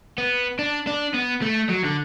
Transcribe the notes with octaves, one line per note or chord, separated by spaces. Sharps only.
B3
D4
D4
B3
A3
F#3
D3